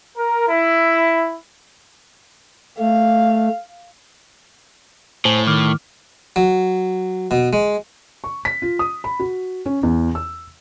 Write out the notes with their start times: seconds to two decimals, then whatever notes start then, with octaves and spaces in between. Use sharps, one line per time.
0.17 A#4
0.48 E4
2.79 A3 F5
5.25 A2 C5 G#5 A5
5.47 D#3 D6 F6
6.36 F#3
7.31 B2
7.53 G#3
8.24 C#6
8.45 B6
8.62 F4
8.79 D#6
9.04 B5
9.20 F#4
9.66 C#4
9.83 E2
10.15 E6